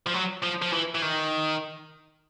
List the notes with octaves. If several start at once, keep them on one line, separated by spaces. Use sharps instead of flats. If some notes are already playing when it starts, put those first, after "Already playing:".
F3
F#3
F3
F3
E3
E3
D#3